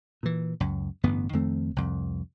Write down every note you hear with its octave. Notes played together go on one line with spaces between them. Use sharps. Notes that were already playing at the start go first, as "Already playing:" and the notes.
A#2 E3
C#2 F#2
A1 G2 D3 B3
F2 D#3 A3 C4
C2 F2